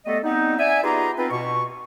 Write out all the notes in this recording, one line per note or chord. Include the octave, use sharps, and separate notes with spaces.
G3 A3 B3 A4 D#5
G3 B3 C4 D#4
D5 E5 G#5
B3 D#4 F4 G4 G#4 A#5
B3 C4 D#4 F4 B4
B2 C#6